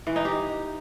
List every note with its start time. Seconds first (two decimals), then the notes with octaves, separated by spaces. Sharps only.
0.07 E3
0.16 D#4
0.25 G4